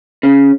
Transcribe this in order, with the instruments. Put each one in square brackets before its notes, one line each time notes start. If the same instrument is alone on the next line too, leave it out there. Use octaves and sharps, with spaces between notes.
[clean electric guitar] C#3